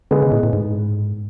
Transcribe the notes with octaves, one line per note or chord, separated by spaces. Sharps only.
D3 G#3 B3
C#3
A2
A2
G#2